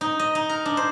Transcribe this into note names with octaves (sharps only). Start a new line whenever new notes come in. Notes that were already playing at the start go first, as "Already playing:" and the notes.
D#4
D#5
D#4
A#4
D4
C5